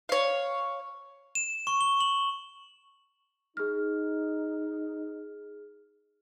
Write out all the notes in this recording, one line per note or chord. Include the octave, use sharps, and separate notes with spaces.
C#5 F5
E7
C#6
G7
F#7
D#4 G#4 F6